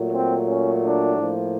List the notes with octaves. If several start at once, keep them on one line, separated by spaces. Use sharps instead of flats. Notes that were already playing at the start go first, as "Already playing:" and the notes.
Already playing: A#2 F#3 A3
C4
C#4
D4
A2 F3 A#3